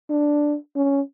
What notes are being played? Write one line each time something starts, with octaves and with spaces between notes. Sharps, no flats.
D4
C#4